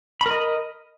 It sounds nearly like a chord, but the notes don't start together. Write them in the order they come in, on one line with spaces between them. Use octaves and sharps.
B5 A#4 D#5